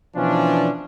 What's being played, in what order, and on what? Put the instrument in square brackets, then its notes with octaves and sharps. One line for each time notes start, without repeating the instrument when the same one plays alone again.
[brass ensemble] B2 E3 F3 C#4 D4